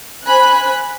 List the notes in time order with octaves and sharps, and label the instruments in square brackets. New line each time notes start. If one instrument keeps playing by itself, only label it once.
[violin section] C5 G#5 B5 F#6